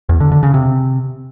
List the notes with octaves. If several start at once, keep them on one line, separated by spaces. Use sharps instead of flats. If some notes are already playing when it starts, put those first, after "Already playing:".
E2
D3
D3
C#3
C3